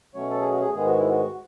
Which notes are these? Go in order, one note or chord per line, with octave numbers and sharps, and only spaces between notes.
B2 F#3 A3 C#4 C#5
A4
G#4
F#4
G#4
G#2 D#3 G#3 B3 G#4
F#4
E4
F#4